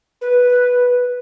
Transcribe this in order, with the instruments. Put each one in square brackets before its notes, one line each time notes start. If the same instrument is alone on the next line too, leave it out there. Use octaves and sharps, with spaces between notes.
[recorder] B4